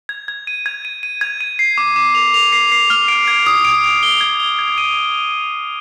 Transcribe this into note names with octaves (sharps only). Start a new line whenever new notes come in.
G#6
G#6
D#7
G#6
D#7
D#7
G#6
D#7
C7
D6
D6
F7
F7
C7
C7
F6
D7
G#6
D#6
D7
D7
G7
G#6
G7
G#6
D#7